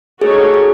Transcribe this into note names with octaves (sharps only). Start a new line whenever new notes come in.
A3 D#4 F#4 G#4 A4 C#5
G#4